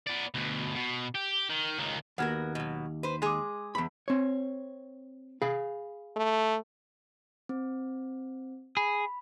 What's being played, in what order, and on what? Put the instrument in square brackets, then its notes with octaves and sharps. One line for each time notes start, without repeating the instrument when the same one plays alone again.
[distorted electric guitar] B3 D5
D2 B2
B2
G4
D#3
C#2 D#3
[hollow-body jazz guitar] D#2 [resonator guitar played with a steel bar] B3 F#4 A#4 [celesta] F#5 F6 G#6
[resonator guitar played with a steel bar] B2 F#3
B4 C5
[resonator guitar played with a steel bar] G#3 G#4 [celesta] C6 D6
[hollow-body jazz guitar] E2 B5
C4 C#5
G#4 F5 B5
[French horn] A3
[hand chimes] C4
[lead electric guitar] G#4 [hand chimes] B5